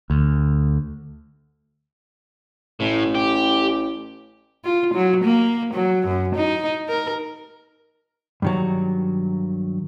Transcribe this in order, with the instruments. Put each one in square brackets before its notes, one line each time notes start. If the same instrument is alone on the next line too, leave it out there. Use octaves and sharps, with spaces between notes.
[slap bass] D2
[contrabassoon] A1 [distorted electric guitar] A2
[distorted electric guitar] G4
[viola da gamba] F4
F#3
A#3
F#3
F#2
D#4
A#4
[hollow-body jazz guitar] G2 D#3 F#3